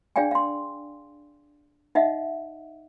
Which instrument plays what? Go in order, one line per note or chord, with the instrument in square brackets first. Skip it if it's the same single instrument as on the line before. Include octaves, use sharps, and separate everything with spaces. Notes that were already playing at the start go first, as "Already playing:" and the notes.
[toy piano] D4 G#4 D5 F5 G5 G#5
F5 C6
D#4 D#5 E5 F#5